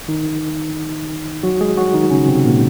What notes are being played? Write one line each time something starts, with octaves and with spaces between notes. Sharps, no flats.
D#3 D#4
F#3 F#4
G#3 G#4
F#3 F#4
D#3 D#4
C#3 C#4
C3 C4
A#2 A#3